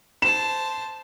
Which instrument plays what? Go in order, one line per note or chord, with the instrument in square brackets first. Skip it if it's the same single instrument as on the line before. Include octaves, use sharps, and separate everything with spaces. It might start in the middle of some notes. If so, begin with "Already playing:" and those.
[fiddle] C5 A5 [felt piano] E7